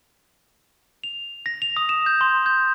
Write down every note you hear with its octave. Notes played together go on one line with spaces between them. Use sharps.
F7
A#6
F7
D#6
E7
G6
C6
G6